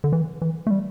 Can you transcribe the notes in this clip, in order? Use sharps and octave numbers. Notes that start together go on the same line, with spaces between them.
D3
E3
E3
A3
G3